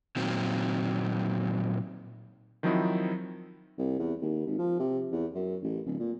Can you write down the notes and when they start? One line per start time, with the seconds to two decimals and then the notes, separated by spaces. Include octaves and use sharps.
0.16 A#2 D#3 F#3 C4
2.63 D#3 F3 F#3 C4 D#4 E4
3.78 C2
3.99 E2
4.22 D#2
4.46 G#1
4.58 F3
4.80 C3
5.12 E2
5.35 F#2
5.62 A1
5.86 D1
5.99 A#2